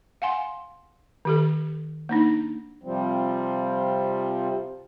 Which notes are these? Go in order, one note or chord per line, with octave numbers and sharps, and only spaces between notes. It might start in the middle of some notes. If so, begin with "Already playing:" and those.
F5 F#5 G#5 C6
D#3 G4 A4
A#3 D4 D#4
C3 F3 G3 C4